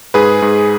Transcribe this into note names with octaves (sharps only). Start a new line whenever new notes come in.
G#2 G#4 B4
G#2